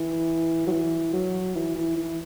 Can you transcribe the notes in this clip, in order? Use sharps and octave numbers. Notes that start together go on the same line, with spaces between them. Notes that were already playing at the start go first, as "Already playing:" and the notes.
Already playing: E3
F#3
E3
F#3
E3
E3
E3